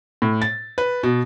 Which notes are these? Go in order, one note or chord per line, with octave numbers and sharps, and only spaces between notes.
A2
A6
B4
B2